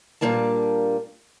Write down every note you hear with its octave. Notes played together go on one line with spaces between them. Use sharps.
A#2 G3 A3 A#3 D4 A5